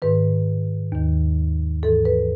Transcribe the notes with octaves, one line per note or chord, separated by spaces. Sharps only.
G#2 D#3 B4
D#2 D#3
G#2 E3 A4
B4